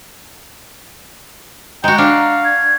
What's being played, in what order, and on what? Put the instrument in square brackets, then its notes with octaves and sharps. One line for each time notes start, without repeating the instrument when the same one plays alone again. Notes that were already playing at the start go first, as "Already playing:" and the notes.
[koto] G#3 F#4 [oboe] G5 [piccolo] A#5
[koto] D4 [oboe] F5
[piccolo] G#6